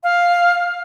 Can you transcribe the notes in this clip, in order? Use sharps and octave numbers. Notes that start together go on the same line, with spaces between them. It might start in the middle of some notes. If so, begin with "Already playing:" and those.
F5